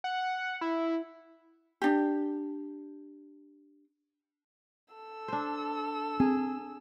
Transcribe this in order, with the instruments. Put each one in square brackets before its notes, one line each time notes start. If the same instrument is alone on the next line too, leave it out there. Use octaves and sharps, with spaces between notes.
[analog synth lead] F#5
E4
[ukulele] D4 G4
[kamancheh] A4 E6
[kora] D4 C5
[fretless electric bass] C4 [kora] G#4